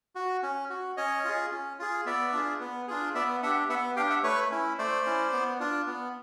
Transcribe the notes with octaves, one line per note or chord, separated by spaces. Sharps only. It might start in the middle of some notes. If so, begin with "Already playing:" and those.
F#4
C#4
F#4
C#4 C#5 D#5
F4 G#4
C#4
F4 G#4
B3 D5 E5
D4 F4 G#4
B3
D4 F4 G#4
B3 D5 E5
D4 G4 E5 F#5
B3 E5 F#5
D4 G4 F5 G5
E5 F#5
A3 B4 C#5
C#4 E4
A3 C5 D5
C#4 E4
B3
D4 F4
B3